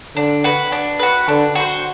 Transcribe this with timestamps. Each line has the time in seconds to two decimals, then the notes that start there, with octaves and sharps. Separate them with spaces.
0.16 D3 D4
0.44 F#4 B4
0.72 D4
0.99 F#4 B4
1.28 D3 D4
1.55 F#4 C5